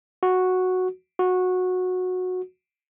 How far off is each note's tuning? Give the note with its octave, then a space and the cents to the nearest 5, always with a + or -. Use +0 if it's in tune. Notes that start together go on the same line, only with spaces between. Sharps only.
F#4 -5
F#4 -15